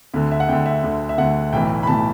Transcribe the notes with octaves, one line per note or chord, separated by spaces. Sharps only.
D2 D3
E5
F#5
D2 D3 G5
E5
D2 D3
E5
D2 D3 F#5
B1 A2 E3 G5
B5
B1 A2 E3 A5